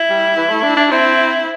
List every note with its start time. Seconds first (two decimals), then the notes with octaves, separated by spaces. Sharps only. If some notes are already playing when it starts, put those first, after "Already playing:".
Already playing: E4
0.10 G3
0.37 E3
0.50 A3
0.63 D4
0.76 D4
0.90 C4 E4